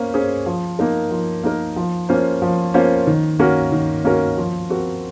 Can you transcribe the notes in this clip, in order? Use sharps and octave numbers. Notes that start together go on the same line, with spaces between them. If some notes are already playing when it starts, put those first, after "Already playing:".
Already playing: A#3 C#4 C5
C#4 G#4 C5
F3
A#3 D#4 A#4
F3
A#3 D#4 A#4
F3
A#3 C#4 F4 C5
F3
A#3 C#4 F4 C5
D#3
A#3 C#4 F#4 A#4
D#3
A#3 C#4 F#4 A#4
F3
C4 F#4 A#4